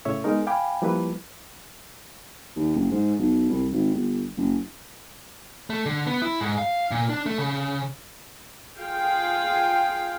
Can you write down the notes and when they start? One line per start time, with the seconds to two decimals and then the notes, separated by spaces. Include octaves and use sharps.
0.05 A2 C#3 C#5 E5
0.24 G#3 B3 D#4 A#4
0.47 F5 G5 G#5 B5 D6
0.82 F3 G3 A#3 E4 B4
2.56 D#2
2.76 F#1
2.91 G#2
3.19 B1
3.49 C2
3.72 G#1
3.94 G1
4.37 F#1
5.70 A3
5.86 D3
6.07 B3
6.22 E4
6.40 G#2
6.58 F5
6.91 A#2
7.10 D4
7.26 A3
7.38 C#3
8.78 F4 G#4 F5 G5